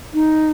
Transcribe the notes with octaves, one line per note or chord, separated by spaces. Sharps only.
D#4